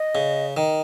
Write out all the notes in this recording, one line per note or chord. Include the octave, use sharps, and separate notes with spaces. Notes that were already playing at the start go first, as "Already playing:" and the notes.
Already playing: D#5
C#3
D#3